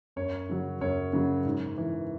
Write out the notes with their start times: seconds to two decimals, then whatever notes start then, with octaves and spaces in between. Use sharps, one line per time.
0.16 F#2 C#5
0.49 C#3 F#3
0.81 F#2 C#5
1.13 C#3 F#3
1.45 G#2
1.77 E3